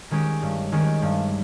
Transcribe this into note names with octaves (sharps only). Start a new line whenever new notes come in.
D#3 G#3 C#4 G4
G2
D#3 G#3 C#4 G4
G2